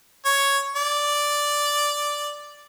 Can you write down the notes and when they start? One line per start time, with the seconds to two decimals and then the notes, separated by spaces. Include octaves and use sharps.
0.25 C#5
0.76 D5